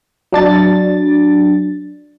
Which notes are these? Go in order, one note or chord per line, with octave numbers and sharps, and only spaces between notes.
F#3 D4 A6